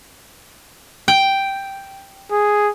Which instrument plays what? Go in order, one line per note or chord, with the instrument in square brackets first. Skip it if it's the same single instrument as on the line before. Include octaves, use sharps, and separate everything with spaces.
[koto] G5
[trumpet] G#4